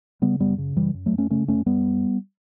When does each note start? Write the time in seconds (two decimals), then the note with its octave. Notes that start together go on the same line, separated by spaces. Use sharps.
0.22 C#3 G3 B3
0.40 F#2 G3 B3
0.58 C#3
0.76 F#2 E3 G3
0.94 F#2
1.06 F#3 A3
1.12 F#2
1.18 A3 C#4
1.30 C#3 A3 C#4
1.48 F#2 A3 C#4
1.66 F#2 G3 B3